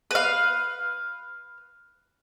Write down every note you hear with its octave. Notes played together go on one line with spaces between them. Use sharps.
B4 F5